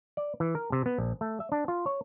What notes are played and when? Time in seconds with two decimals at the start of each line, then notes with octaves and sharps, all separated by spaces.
0.17 D5
0.40 E3
0.55 A#4
0.72 C3
0.86 B3
0.98 A#1
1.21 A3
1.40 E5
1.52 D4
1.68 F4
1.86 C#5